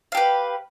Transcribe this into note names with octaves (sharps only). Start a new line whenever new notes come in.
G4 B4 F5